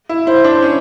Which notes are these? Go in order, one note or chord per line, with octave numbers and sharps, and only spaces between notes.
E4
E4 C5
D4
C#4